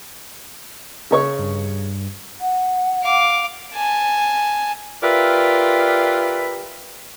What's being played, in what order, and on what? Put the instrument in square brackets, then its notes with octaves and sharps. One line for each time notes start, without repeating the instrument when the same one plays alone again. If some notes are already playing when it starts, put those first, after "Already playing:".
[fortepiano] C#3 C#5 C#6
[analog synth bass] G2
[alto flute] F#5
[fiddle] F5 D6
[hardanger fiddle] G#5 A5
[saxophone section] F4 G4 A#4 B4 D5 E5